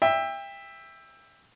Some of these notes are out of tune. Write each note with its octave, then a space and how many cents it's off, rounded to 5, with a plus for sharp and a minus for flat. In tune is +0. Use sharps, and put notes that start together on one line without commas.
E5 +0 G5 +25